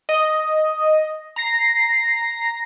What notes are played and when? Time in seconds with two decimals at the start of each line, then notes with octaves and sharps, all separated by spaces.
0.09 D#5
1.36 A#5 A#6 C7